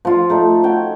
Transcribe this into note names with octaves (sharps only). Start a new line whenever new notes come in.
F3 F4
A3 D#4 A4
F#4 C#5 G5